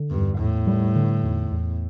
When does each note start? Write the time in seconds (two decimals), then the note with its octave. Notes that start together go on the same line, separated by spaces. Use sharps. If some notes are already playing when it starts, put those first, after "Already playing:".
Already playing: D3
0.11 E2 G2
0.39 E2 A2
0.67 G3
0.95 D3
1.23 E2
1.51 E2